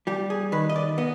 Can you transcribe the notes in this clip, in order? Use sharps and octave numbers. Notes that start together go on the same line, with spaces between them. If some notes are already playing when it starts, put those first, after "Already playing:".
G3 G4
G#4
D#3 B4
D#5
D5
B3 D#5